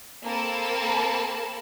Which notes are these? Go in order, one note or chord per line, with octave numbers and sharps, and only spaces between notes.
A#3 C4 A4 A#4 A5 B5